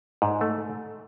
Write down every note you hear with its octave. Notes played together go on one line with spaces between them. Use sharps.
G#2
A3